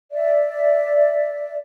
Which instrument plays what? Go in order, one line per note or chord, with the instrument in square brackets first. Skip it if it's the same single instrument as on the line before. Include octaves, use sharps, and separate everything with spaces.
[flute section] D5 E5